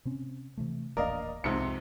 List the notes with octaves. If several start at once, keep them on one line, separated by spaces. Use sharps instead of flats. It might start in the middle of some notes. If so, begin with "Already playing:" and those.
C3 C4 C#4
C3 E3 A3
D#1 A1 A#3 A#4 D5 D#5 F5
C2 F2 G#2 C3 C#7